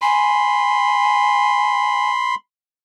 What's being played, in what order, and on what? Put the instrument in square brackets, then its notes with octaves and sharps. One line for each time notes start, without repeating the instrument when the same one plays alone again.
[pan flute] G#5 [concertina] B5 C6